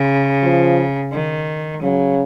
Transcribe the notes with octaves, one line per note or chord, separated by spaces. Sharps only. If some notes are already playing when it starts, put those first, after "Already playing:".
Already playing: C#3
F3
D#3
C#3 F#3